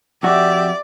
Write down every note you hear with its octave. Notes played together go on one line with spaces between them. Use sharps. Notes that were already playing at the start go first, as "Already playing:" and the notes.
F2 F#4 G4 D5 E5